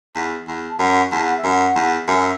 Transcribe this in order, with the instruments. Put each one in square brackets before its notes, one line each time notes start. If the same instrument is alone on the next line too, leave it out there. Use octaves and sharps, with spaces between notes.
[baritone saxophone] E2
E2
[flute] A5
[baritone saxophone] F#2 [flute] F#5
[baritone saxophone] E2 [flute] A5
[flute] F#5
E5
[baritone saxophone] F#2
[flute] F#5
[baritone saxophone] E2
[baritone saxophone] F#2 [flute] E5